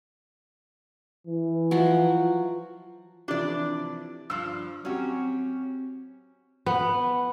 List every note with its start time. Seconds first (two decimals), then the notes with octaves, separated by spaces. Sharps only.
1.27 E3
1.71 F3 F#3 F#4
3.28 C3 E3 F3 D4 D5
4.30 G2 F3 E6
4.85 F#3 C4 C#4 F#4 G4
6.66 B3